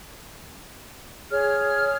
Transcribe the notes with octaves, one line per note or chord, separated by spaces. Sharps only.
G#4 C#5 F6